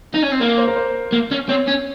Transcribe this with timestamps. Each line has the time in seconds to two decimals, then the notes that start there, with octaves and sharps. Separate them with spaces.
0.14 D#4
0.22 C#4
0.32 C4
0.40 A#3 A#4
0.58 C5
0.68 A#4
0.76 C5
1.12 A#3
1.31 C#4
1.49 C4 C#5
1.67 C#4